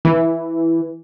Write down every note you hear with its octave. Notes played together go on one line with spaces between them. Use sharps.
E3